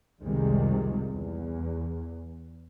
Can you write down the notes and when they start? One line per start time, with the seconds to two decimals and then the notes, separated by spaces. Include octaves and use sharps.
0.22 C2 F2 C3 D#3 G3 G#3
1.12 E2